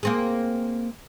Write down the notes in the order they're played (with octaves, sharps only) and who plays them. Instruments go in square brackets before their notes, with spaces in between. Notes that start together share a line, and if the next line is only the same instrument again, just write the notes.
[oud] A#3 C4 G#4